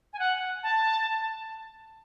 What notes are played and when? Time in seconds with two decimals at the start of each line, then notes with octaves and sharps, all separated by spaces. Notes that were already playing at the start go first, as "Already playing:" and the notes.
0.13 G#5
0.19 F#5
0.63 A5